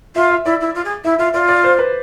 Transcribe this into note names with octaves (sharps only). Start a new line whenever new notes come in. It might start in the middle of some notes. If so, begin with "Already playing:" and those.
F4 E5
E5
E4 D5
E4
F4
G#4
E4 E5
F4 E5
F4 D5
D5
C5
B4